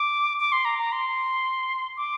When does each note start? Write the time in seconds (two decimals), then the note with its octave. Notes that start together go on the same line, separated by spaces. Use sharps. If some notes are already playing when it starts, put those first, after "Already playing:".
Already playing: D6
0.40 D6
0.52 C6
0.65 A#5
0.79 A#5
0.92 C6
1.97 D6